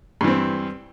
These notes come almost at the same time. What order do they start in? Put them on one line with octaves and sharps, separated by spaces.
G2 E3 C4